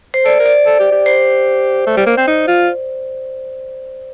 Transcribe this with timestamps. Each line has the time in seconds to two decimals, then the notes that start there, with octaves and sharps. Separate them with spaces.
0.14 C5
0.25 A4 D5
0.39 A#4
0.46 D5
0.66 A4
0.80 G4
0.92 G4
1.06 C5
1.87 A3
1.97 G3
2.06 A#3
2.17 C4
2.27 D#4
2.48 F4